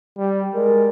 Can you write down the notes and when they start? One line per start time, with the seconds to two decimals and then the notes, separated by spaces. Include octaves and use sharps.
0.18 G3
0.55 G#3 A#4 D5